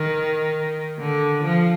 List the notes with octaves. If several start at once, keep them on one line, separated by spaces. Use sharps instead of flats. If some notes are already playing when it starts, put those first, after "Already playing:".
Already playing: D#3
D3
F3